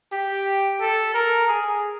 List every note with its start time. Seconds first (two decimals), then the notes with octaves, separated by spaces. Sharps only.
0.12 G4
0.80 A4
1.14 A#4
1.47 G#4